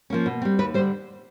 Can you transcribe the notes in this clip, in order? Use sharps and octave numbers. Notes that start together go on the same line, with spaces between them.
F3 A#3 C#4
B2
G3 C4
D#2 B4
D3 G3 C5